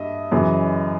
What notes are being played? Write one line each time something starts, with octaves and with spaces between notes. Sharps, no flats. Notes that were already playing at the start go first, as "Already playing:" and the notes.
Already playing: G2 D#5 E5
F#2 C#3 E3